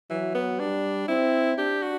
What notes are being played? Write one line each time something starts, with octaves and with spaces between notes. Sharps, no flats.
E3 F#3
B3
G3 D4
C4 E4
D4 G4
F#4